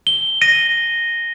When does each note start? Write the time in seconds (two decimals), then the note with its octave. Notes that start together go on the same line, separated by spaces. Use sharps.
0.07 G7
0.41 A#6 D#7